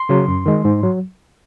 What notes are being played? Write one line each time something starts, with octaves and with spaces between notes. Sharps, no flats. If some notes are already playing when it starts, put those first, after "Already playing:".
Already playing: C6
C#3 F#3
F#2
D#3 G#3
G#2
F#3